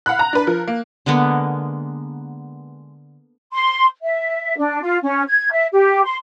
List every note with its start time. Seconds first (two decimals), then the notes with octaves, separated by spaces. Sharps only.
0.06 F5 F#5 B5 F#6
0.19 A#5
0.33 D4 B4
0.47 F3 A#4
0.68 A#3
1.06 D3 G#3 A#3 B3
3.53 C6
4.02 E5
4.58 D4
4.81 F4
5.03 C#4
5.27 G#6
5.51 E5
5.72 G4
6.04 C6